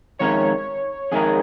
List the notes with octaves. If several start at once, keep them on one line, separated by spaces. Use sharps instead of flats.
F2 D#3 G#3 C#4 A#4 C#5
F2 D#3 G#3 C#4 G#4 A#4